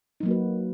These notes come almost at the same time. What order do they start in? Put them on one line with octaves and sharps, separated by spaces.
D#4 F#3 A#3 F#4 B4